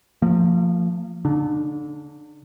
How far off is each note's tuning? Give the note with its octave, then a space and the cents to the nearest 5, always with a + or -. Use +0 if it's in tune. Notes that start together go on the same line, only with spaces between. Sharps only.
F3 +0 A#3 -45
D3 -30 D4 +45